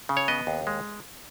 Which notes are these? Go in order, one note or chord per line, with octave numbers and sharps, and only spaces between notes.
C#3
C#5
B3 D#5
D#2
G#3